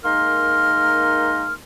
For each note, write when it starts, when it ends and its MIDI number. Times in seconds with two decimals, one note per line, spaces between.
0.04 1.54 56
0.04 1.54 58
0.04 1.54 63
0.04 1.54 70
0.04 1.54 84
0.04 1.54 89